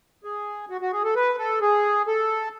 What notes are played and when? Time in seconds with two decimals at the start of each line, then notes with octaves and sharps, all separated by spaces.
0.24 G#4
0.70 F#4
0.81 F#4
0.92 G#4
1.04 A4
1.15 B4
1.39 A4
1.61 G#4
2.07 A4